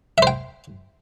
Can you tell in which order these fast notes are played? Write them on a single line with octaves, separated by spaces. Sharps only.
E5 C5 G5